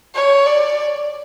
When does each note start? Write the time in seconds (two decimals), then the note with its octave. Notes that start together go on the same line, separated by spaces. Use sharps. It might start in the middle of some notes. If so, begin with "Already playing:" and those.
0.15 C#5
0.47 D5